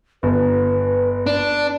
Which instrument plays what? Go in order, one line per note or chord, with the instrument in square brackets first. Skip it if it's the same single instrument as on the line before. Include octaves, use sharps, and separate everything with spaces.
[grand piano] G1 [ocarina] B4
[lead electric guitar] D4